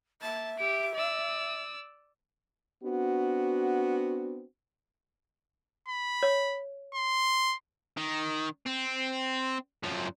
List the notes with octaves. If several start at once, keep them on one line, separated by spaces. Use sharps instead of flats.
A#3 E5 A5
G4 D7
D5 E6
B3 C4 D4 F#4
B5
C#5
C6
D#3
C4
F#2 F3